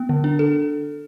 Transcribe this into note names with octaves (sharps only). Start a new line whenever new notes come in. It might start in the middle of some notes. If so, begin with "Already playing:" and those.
Already playing: B3
D3
D4
A4